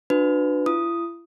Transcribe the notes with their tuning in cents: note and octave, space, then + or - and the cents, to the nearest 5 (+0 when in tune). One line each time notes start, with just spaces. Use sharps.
D4 +15 F#4 -40 B4 +15
E4 +45 D#6 +0